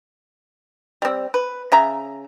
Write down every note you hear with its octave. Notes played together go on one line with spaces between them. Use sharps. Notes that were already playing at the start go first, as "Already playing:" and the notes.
G3 C4
B4
C#3 E5 A#5